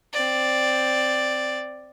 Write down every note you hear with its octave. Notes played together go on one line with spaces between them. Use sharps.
C4 D5